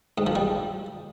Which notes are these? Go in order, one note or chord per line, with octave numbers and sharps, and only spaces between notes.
G#2
F3
G3